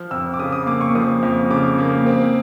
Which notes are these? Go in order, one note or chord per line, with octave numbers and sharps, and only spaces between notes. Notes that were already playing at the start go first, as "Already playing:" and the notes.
Already playing: F3 F6
F2 E6
D6
C#3 D#6
D#6
A#3 D6
C#6
F3 D#6
F2
C#3 D6
A#3
C4